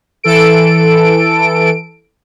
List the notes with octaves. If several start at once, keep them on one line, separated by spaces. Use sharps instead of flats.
E3 A4 D7